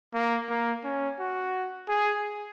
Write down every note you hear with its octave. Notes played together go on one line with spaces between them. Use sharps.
A#3
A#3
C#4
F#4
G#4